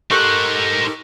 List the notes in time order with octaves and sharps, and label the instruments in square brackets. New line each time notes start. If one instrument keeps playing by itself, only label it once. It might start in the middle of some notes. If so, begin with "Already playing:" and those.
[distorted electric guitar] D#4 C5 [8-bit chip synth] G4 A4 A#4 [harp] C#6 F#6 C#7